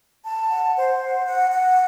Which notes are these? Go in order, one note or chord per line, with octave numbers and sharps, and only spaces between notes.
A5
F#5
C5
F#5
F#5
F#5